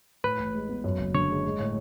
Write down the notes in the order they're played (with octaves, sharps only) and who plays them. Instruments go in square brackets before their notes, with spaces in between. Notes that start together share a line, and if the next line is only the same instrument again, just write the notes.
[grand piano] A2 [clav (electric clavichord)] B4
[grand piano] A1
G#3
B3
F#2
F#1
[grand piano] D3 [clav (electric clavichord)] C#5
[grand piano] G#3
G#3
A2